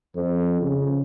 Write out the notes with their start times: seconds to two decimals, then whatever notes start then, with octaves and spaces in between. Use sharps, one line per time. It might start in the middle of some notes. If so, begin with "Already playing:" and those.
0.15 F2
0.61 C#3